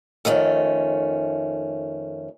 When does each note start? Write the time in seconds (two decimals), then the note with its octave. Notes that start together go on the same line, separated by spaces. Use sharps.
0.25 F2 D#3 A3 C#4